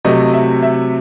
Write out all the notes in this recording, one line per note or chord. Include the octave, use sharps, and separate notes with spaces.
C3 F#3 A3 D#5
E5
E5